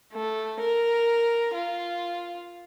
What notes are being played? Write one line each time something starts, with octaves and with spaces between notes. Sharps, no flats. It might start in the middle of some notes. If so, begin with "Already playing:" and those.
A3
A#4
F4